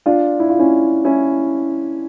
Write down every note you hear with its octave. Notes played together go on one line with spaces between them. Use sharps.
D4 F4
E4
F4
C#4 E4
C#4 E4